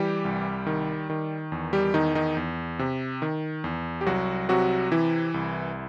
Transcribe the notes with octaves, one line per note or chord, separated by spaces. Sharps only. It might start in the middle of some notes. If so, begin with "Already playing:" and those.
Already playing: E3 G3 G4
C2
D#3
D#3
E2
G3 G4
E2 D#3 D#4
D#3 D#4
E2
C3
D#3
E2
G4
C2 F#3 F#4
C3 F#3 F#4
E3 E4
C2